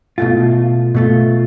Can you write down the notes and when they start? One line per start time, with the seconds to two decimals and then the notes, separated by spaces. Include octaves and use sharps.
0.18 B2 A3 F4
0.95 B2 A3 F4